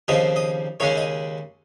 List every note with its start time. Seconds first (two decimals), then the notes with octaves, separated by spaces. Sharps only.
0.08 D#2 C#3 F3 C4 D#5
0.36 D#5
0.80 D#2 C#3 G#3 C#4 C#5
0.97 D#5